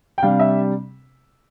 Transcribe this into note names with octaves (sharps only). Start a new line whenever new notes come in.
G5
C3 G3 D4 F5
E5